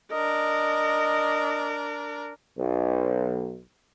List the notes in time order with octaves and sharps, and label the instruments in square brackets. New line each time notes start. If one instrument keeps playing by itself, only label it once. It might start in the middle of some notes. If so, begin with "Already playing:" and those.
[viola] D4 A#4 [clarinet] D#5
[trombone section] B1